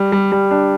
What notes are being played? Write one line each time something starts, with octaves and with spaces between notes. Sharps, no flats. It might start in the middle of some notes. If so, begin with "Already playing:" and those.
Already playing: G3
G3
G3
D4